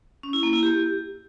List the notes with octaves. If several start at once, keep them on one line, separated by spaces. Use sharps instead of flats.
C#4
E4
A#3
E4
G4